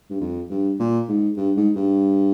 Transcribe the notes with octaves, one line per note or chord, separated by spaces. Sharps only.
G2
F2
G2
A#2
G#2
G2
G#2
G2